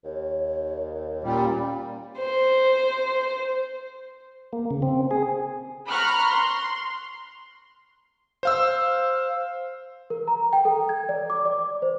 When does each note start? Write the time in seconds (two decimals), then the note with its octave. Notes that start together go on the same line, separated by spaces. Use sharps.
0.04 D#2 C#5
1.24 A#2 G3 C#4
2.19 C5
4.53 A#3
4.71 C#3
4.82 C4
5.11 G#4
5.90 A#5 B5 C#6 F6 F#6
6.29 C6
8.43 C5 F5 E6
10.10 A#4
10.28 A#5
10.53 G5
10.65 A4
10.89 G#6
11.09 D5
11.30 D6
11.45 D5
11.82 C5